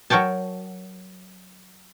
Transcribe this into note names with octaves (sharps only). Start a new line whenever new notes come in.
F#3 A#4 C#5 G5 A5